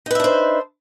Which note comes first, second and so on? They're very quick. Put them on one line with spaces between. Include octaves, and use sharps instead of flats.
D#4 B4 E5 D4 C5